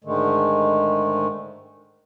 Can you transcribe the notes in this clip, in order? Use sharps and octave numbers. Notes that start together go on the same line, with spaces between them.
G#2 D3 D#3 G#3 A3